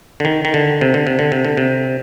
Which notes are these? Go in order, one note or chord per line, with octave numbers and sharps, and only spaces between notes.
D3
D#3
D#3
D3
C3
D3
C3
D3
C3
D3
C3